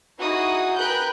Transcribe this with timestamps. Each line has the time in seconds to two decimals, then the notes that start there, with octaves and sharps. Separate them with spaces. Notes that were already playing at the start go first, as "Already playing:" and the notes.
0.20 D#4 E4 F#4 G#4 D#6
0.77 A#4 B4 G5 F#6 G6